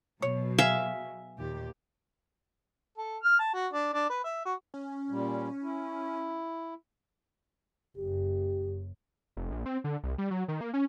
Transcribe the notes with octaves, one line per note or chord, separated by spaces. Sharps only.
B2 F#3 C#5
G#4 E5 F5
D#2 A#2 G4
A4
F6
A5
F#4
D4
D4
B4
E5
F#4
C#4
A#2 G3
E4
F#1 F#2 G4
F1
A#1
C4
D3
C2
G3
F#3
D#3
A#3
C#4